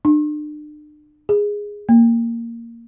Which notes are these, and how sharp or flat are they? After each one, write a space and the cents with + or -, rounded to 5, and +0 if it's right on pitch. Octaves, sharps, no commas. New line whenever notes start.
D4 +40
G#4 -10
A#3 -10